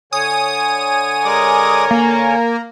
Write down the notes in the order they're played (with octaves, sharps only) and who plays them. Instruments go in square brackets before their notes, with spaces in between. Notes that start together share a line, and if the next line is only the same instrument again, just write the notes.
[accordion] D3 C#5 G#5 [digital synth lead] D#6
[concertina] G#3 D5 D6 [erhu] A#4
[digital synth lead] A#3 [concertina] A#5